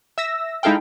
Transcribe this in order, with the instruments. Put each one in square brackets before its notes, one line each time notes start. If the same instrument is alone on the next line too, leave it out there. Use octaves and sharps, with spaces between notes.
[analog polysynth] E5 E6 A#6
G#3 D#4 E4 A4 F5 G5